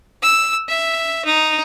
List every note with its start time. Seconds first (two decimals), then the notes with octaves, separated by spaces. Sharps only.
0.23 E6
0.68 E5
1.25 D#4